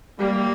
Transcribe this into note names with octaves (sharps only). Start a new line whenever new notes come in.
G3 A#3